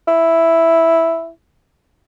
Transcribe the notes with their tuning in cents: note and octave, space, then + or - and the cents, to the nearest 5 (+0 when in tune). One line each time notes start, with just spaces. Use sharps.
E4 +0